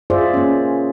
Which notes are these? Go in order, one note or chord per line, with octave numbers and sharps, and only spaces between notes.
F4 G#4 C5 D5 E5
A#3 C#4